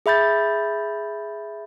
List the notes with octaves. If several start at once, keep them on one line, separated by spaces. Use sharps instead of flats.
G#4 E5 B5 G6 A6